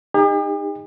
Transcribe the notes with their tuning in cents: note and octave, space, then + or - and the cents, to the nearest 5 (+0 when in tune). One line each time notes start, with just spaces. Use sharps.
D#4 -10 G4 +45